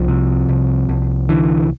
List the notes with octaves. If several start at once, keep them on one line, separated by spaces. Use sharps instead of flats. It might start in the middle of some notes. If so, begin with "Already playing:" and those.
Already playing: C2 F3
C3
C2
C2
D3 E3